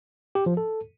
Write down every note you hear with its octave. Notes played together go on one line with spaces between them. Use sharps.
G4
F3
A4